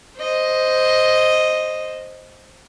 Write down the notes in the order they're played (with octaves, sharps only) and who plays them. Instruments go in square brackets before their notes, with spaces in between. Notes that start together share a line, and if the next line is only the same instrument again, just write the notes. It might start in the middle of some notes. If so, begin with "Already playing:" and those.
[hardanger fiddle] C5 D#5